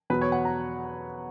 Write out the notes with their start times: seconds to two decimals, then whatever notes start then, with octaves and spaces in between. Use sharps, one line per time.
0.10 E2 B2 F#3 B4
0.21 C#5
0.32 F#5
0.45 A#5